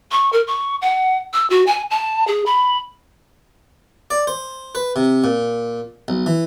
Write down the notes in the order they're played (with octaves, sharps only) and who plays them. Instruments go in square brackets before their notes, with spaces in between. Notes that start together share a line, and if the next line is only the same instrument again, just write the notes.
[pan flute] C#6
A#4
C#6
F#5
E6
F#4
G#5
A5
G#4
B5
[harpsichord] D5
C5
B4
C3
A#2
B1
E3